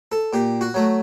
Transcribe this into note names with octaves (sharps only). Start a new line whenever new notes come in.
A4
A#2 G4
F#4
F#3 A3